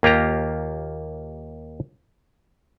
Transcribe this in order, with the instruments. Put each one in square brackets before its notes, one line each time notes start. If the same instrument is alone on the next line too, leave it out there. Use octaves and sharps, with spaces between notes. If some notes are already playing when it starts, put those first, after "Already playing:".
[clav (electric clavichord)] D#2 A#3 F4 G4 A#5